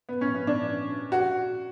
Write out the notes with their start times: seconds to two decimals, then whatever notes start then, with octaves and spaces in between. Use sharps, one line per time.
0.09 B3
0.21 C#4
0.35 B3
0.47 D4
1.12 F#4